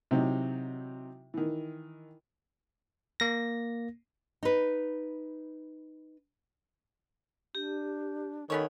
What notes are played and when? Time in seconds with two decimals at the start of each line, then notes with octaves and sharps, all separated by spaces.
0.11 C3 E3 F#3 C4 D#4
1.34 D#3 E3
3.20 A#3 A#6
4.43 D#4 B4
7.55 D4 G4
8.50 D#3 B3 C#4 A4 C#5